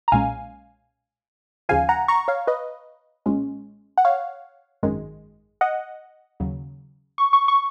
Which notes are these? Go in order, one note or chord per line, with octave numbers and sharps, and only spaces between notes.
A#5
B1 A#2 G#3 C#4 F5 G#5
D#2 C#3 F3 F5 G#5
F#5 A#5
A#5 C#6
C#5 F5
B4 D#5
B1 A#2 G#3 C#4
F#5
C#5 F5
G#1 F#2 D#3 G#3
D#5 F#5
D#2 C#3 F#3
C#6
C#6
C#6